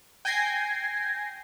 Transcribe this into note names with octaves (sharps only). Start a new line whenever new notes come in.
G5 G#5 G6 G#6 A#6 C7